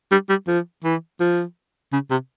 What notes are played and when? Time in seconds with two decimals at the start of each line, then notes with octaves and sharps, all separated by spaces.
0.11 G3
0.29 G3
0.48 F3
0.84 E3
1.20 F3
1.92 C#3
2.10 C3